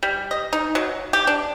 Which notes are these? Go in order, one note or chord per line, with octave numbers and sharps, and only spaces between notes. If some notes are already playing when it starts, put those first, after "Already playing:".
G3
D#5
D#4
F#3
G4
D4